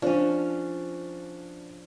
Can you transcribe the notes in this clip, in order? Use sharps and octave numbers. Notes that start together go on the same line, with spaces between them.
F3 C#4 D4